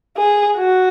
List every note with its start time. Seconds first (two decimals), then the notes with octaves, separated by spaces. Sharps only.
0.17 G#4
0.57 F#4